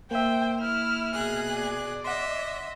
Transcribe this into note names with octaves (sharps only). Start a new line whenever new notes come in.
A#3 C5 E5 G5
E4 F6
B2 G#4 F#6
D5
D#5 E5 F#5 C6